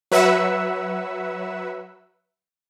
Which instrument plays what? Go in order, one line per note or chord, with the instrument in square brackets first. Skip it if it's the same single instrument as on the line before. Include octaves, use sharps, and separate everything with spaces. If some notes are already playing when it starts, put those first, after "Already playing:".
[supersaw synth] F#3 B4 E5 F#5 E6